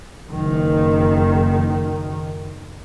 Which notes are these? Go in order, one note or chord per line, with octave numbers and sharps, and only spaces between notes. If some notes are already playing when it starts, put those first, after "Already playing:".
F#1 D#3